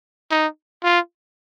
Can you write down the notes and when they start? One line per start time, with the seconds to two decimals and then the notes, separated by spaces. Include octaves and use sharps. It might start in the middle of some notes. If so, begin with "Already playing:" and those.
0.31 D#4
0.84 F4